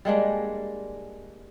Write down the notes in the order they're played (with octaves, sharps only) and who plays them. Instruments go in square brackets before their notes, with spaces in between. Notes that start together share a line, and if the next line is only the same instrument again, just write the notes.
[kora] G3 G#3 A#3 D4